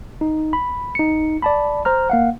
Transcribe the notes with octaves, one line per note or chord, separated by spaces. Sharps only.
D#4
B5
D#4 C#7
D5 A5 B5
C5 A#5 F6
A#3 F5 F#5